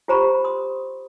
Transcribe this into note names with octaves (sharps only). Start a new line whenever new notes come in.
F4 G4 C5 A#5 B5 C#6
C6 D#6